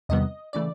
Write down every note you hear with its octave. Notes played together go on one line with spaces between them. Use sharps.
E2 C3 D#3 G3 B3 D#5
C#3 E3 A3 D5